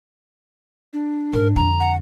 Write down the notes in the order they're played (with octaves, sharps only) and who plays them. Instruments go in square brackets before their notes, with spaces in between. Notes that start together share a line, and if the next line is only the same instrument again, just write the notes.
[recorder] D4
[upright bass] G#2 [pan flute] A#4
[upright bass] F2 D3 [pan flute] A#5
[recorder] F#5